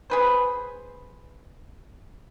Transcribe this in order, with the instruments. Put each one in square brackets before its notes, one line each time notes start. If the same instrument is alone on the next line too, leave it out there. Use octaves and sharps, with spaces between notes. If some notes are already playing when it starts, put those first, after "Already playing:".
[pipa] G#4 B4 C5